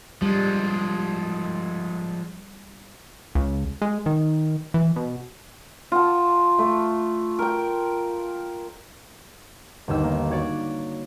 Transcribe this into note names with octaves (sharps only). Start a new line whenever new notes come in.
F3 G3 G#3
C#2
G#3
D#3
E3
B2
F4 F#5 A5
A3
A#4 G5
G1 D#2 E6
A#3
F#4 C#5 D5